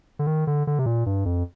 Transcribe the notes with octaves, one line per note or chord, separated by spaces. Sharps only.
D3
D#3
D3
D3
C3
A#2
G2
F2